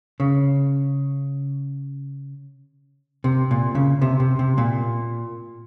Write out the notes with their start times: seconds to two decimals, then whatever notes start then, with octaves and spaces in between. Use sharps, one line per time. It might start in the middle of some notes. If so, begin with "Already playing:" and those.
0.20 C#3
3.24 C3
3.51 A#2
3.75 C#3
4.02 C3
4.20 C3
4.39 C3
4.58 A#2